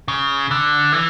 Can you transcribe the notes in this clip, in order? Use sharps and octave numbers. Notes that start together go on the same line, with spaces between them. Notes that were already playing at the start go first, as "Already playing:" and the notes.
C#3
D3
E3